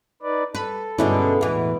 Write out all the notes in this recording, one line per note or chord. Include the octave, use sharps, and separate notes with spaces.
D#4 B4 D5
A4 B4
G2 B2 D3 G#3 C#4 E4
E2 A2 E3